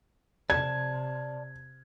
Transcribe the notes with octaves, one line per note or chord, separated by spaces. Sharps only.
C3 D5 A5 G#6